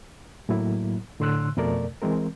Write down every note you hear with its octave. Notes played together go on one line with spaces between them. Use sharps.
A2 F#3 A#3 E4
A2 D3 C6 E6 F#6
F2 B2 A3 A#4 D5
E3 G#3 C4 A#4